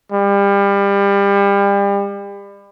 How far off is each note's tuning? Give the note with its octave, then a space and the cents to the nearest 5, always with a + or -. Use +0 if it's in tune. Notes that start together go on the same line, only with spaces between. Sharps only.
G3 +30